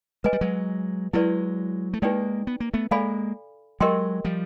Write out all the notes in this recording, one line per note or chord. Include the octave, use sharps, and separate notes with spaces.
G#3 B4 D#5 G#5
G3
F#3 G#3
F#3 G#3 E4 G4 B4 D5
A3
G#3 A#3 D#4 G4 B4 D5 G5
B3
A#3
A3 B3
G#3 A#3 A4 D5 F5 G#5 B5
F#3 G#3 G4 A#4 D#5 G5 C6
F3 G3